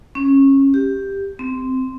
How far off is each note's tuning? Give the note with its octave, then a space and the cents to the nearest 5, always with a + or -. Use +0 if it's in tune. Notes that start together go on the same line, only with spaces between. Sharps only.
C#4 -20
G4 +5
C4 -10